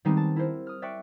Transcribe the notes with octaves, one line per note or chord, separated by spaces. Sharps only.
D#3 G3 G#3 B3 C4 D#4
A5
E4 A#4 C5
D#6 F6
D5 E5 G5 C#6 F#6